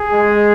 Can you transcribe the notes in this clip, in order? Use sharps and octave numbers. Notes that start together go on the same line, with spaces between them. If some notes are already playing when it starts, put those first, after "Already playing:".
Already playing: G#4
G#3